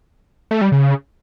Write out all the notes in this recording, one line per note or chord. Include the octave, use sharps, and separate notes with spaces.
A3
G3
C#3